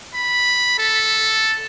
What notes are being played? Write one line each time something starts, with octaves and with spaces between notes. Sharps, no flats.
B5
A4